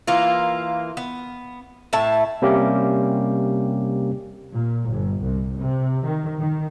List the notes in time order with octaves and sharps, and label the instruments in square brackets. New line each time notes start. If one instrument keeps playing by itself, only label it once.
[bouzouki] E3 A#3 F4
B3
A2 E5 A5
[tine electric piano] C3 G3 A#3 C#4 G4
[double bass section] A#2
G1
C2
C3
D#3
D#3